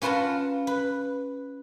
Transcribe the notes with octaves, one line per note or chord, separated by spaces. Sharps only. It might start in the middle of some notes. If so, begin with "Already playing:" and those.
C#4 F4 B4 F#5 A5 A#5
B4